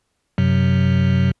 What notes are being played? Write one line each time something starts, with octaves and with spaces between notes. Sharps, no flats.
F#2 C3 F#3